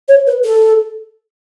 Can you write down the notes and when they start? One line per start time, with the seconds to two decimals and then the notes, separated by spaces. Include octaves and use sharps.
0.09 C#5
0.27 B4
0.44 A4